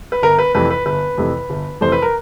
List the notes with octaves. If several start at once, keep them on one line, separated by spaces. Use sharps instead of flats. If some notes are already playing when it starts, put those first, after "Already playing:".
B4
G1 A#4
B4
F2 C3 E3 A3 B4
B4
G1 B4
F2 C3 E3 A3
G1
F2 C3 E3 A3 C5
B4
A#4